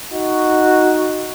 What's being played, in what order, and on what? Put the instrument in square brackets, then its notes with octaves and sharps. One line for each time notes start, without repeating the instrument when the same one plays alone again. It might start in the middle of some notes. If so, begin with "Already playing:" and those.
[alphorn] D#4 [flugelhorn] F#4